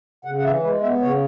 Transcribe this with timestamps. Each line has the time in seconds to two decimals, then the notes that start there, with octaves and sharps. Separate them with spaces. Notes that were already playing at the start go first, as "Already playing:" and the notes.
0.25 C#3 F#5
0.38 F#5
0.44 E3 E5
0.63 G#3 B4
0.82 B3 E5
1.01 C#3 C#5